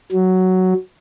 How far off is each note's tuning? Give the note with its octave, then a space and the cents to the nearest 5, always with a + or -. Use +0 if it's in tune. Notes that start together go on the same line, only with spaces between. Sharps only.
F#3 +5